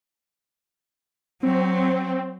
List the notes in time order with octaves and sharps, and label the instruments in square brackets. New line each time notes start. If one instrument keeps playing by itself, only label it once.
[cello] F#3 [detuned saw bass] C4